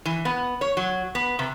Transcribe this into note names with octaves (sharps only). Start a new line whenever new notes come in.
E3
B3
C#5
F#3
B3
C3